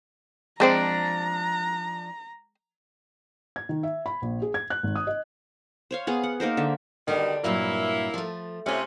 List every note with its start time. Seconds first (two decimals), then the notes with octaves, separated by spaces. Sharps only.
0.60 F3 G#3 C4 D4 C5 D5 A#5
3.56 G#6
3.69 D#3
3.83 E5
4.06 B5
4.22 A#1
4.42 G#4
4.54 G#6
4.70 F#6
4.83 G#1
4.96 D#6
5.07 D#5
5.91 C5 C#5 F5
6.07 B3 G#4 F5
6.23 F#5
6.40 A#3 D#4 A#4 C5
6.57 D3 E5
7.08 B2 D3 D#3 G3 D4
7.44 G2 A#2 F#3 A#3 E4
8.14 F3 A3
8.66 C3 A3 C#4 F4